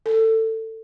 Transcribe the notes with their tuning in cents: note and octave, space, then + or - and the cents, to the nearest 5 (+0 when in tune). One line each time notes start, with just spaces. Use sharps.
A4 +20